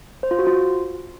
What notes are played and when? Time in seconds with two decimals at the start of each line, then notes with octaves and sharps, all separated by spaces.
0.23 C5
0.31 F4
0.39 F#4
0.47 F4